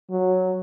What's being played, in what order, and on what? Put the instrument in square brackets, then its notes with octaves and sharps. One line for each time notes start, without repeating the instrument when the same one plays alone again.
[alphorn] F#3